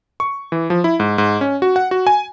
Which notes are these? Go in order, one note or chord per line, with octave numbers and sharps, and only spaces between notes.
C#6
E3
F3
E4
G#2
G#2
C#4
F#4
F#5
F#4
G#5